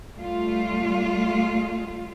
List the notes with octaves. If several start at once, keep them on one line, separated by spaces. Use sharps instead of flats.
G3 A3 F4